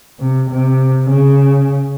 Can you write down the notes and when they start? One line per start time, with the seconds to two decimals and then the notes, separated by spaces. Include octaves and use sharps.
0.20 C3
0.51 C3
1.10 C#3